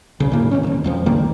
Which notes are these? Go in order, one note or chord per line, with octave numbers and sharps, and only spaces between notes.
B1 C#3
D2 A2 C#3 A#3
G#1 E2 D#3 C#4
D#1 G#1
D#1 F2 F3
C#2 G2 D#3 A#3